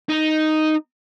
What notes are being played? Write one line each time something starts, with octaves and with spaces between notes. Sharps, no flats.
D#4